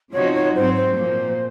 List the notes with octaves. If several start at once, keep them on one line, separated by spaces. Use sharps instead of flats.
C#3 F3 C4 D#4 F#4 C#5
C#5
G#2 F#3 C4 C5
C5
A#2 F3 A#3